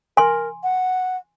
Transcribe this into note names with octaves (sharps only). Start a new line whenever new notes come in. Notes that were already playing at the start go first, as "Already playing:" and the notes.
A#4 G#5 C6
F#5